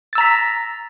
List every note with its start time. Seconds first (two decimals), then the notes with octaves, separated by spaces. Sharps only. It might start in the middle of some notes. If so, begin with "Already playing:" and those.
0.13 A6
0.15 E6
0.18 A#5
0.21 B6